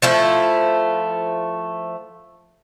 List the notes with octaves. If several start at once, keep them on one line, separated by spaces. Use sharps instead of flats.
F3 A3 E4